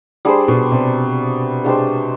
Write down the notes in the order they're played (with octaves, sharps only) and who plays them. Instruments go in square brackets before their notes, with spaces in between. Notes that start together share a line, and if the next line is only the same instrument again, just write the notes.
[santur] G3 D4 G#4 C5
[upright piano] B2
C3
[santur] G#3 D4 G4 C5